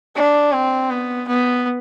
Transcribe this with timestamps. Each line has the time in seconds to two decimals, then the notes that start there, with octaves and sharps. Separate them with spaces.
0.16 D4
0.52 C4
0.91 B3
1.28 B3